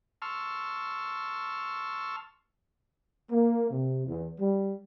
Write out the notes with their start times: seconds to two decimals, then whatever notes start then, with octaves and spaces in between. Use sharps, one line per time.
0.22 A5 C6 C#6 E6 F6
3.31 A#3
3.71 C3
4.07 E2
4.40 G3